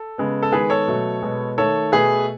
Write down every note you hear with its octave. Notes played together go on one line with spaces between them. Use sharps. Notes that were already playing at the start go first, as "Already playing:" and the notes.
Already playing: A4
C#3 G#3 B3
A4
D#3 G#3 B3 G#4 B4
A4 C#5
B2 F#3 A3
B2 G#3 B3
D#3 A3 A4 C#5
B2 A3 G#4 B4